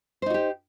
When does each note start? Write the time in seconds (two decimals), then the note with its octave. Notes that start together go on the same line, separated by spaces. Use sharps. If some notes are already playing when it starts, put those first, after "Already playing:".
0.22 C5
0.26 D#4
0.30 F#4
0.34 G4